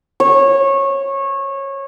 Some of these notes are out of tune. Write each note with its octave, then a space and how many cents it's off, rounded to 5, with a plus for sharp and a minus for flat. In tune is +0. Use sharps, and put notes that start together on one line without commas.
C#5 -20